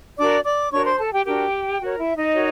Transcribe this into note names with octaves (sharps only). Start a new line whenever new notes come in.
D4 F#4 A#4 D5 D6
D5 D6
D4 F#4 A#4 C#5 C#6
C5 C6
A4 A5
G4 G5
D4 F#4 G4 A#4 G5
F#4 A#4 C#5
E4 E5
D#4 D#5
F#4 A#4 C#5